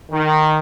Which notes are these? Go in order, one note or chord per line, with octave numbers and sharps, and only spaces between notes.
D#3